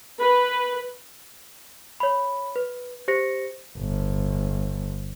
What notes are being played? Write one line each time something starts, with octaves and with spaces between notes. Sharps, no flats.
B4
C#5 B5
B4
G4 C5 A#6 C#7
G1